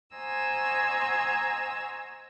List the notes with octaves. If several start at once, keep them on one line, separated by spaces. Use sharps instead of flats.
F#4 C5 D#5 G#5 A#5 E6